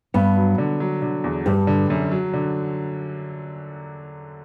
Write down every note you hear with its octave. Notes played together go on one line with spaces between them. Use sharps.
G2 B3
F#3
D3
F#3
D3
E2
G2 G3
D3
F#2
F#3
D3